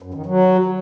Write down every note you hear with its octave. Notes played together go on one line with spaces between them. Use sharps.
F#2
D#3
F#3